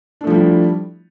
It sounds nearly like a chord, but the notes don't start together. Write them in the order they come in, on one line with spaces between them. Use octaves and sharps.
D4 A3 F3 G3 E4